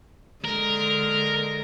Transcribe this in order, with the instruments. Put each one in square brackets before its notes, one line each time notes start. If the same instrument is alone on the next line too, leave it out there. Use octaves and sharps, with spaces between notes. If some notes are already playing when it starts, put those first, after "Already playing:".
[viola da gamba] D3 G#3 [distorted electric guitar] A#4